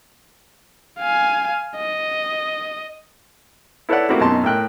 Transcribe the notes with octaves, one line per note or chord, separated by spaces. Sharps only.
F5 G#5
D#5
E4 A4 B4 C#5 D5 F#5
A3 A#3 C4 E4 F#4 G4
F#2 B2 D#4 A5 C6
A2 A#4 G5 F#6